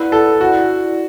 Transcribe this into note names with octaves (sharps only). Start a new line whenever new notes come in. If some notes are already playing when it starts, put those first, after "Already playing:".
Already playing: E4 B4 D5 F#5
A4
F#4